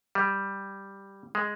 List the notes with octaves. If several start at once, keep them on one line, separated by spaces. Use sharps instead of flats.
G3
G#3